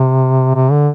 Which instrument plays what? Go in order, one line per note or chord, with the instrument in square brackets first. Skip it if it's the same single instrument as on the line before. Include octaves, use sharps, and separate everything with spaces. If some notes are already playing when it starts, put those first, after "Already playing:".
Already playing: [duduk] C3
C3
D3